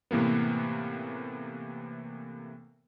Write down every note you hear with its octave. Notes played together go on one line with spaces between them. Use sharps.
A2 C3 E3 A#3 B3